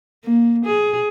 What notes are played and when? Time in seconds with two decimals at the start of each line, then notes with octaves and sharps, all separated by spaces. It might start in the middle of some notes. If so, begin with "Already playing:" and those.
0.25 A#3
0.66 G#4